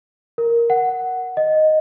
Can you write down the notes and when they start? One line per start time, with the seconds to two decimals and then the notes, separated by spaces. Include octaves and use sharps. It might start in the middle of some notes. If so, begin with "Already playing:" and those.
0.38 A#4
0.70 F#5
1.37 D#5